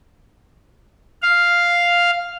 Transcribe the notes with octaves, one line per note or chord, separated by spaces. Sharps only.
F5